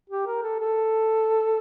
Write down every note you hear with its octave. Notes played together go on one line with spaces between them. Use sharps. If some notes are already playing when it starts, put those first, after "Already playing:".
G4
A#4
A4
A4